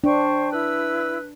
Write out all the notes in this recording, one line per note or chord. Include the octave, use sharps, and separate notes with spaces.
D4 C5 G5 C#6
E4 B4 E6